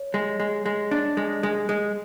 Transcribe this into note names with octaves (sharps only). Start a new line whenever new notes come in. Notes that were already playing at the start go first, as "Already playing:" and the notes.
Already playing: C#5
G#3
G#3
G#3
D4
G#3
G#3
G#3